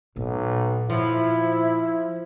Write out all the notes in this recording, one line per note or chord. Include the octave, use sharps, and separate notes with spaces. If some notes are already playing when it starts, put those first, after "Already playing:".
B1 A#2
F3 E4